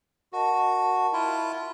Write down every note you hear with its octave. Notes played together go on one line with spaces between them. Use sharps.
F#4 A#4 D#5 A5
E4 F4